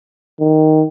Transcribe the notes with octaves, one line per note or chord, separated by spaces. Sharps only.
D#3